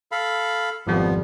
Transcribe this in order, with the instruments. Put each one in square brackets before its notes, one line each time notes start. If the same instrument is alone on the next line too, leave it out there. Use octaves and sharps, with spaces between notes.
[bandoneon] A4 F5 B5
[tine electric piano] G#1 F2 G3 [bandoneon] F3 B3